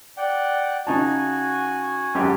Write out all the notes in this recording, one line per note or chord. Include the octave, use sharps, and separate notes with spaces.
D5 F#5 G5
C#3 D#4 F#4 G#5 A5
G#1 F#2 G4